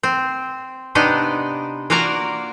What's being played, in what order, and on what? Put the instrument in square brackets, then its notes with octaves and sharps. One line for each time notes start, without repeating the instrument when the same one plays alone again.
[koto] C4
C3 B3 D4 D#4 D5 D#5
A#3 F4 F#4 A#4 D5 A#5